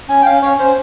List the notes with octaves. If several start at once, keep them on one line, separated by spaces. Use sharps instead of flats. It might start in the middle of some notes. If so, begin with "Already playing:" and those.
C#4 G#5
G5
C#4 F5
C#4 C#5
C#4 C5